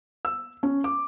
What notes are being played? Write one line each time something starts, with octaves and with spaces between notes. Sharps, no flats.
E6
C#4
D6